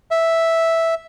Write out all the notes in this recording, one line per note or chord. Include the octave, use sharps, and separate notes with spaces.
E5